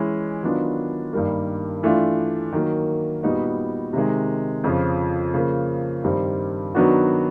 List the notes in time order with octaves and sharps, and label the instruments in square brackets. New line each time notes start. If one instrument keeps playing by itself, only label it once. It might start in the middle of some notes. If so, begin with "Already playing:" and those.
Already playing: [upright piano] E3 G#3 C#4 E4
D#3 F#3 B3 D4 F4
G2 D#3 G3 A#3
E3 A3 D4 F4
D#3 F#3 A#3
A#2 G3 B3 D#4 F#4
C3 D#3 G#3
F2 C#3 F3
C#3 F3 A#3
G2 D#3 G3 C4
D#3 F#3 B3 D4 F#4